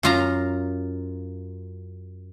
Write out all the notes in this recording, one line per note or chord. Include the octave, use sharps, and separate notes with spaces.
F#2 F4 A#5